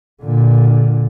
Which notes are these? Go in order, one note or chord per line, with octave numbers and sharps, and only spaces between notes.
A#2 D3